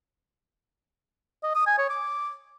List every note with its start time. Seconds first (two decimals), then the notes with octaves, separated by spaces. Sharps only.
1.43 D#5
1.55 D#6
1.67 G#5
1.78 C#5
1.90 D6